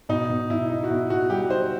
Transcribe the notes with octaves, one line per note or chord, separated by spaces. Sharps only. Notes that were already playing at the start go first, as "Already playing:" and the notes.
B2 D#4
B2
B2 E4
D#4
F#4
B2 E4
B2 F#4
G3 G4
D#4 C5